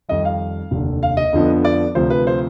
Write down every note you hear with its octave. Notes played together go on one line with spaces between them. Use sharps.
F2 D#3 G3 D#5
F5
F1 D#2 D3
F5
D#5
F2 D3 F3 B3 D4
D5
D2 C3 F3 C5
B4
C5